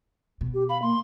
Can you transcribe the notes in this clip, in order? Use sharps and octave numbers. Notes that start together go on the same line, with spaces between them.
B2
G4
F5 B5
A#3 C6